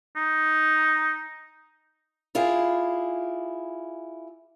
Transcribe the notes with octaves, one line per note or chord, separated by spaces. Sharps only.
D#4
E4 F4 G4 G#4